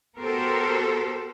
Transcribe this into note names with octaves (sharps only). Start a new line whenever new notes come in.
B3 F#4 G4 A4 A#4 C5